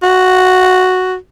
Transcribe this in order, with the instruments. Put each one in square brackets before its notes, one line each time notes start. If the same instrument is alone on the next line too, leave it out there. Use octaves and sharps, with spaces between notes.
[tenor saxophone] F#4